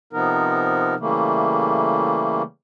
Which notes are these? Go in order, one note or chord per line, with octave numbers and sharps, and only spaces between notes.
C3 F3 B3 D#4 A#4
C#3 E3 G3 A3 A#3